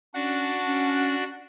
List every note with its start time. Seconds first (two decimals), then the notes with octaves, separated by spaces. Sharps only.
0.14 C#4 D4 F#4 D5 F#5
0.66 C#4